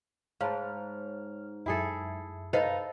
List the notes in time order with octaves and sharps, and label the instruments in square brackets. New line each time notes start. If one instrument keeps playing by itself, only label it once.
[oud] G#2 [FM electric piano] C#5 F6 [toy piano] F5 A5 B5
[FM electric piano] F#2 E5 [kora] E4 G#4 A4
[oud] D#4 B4 F5 [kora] A4 [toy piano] C5 D#5 B5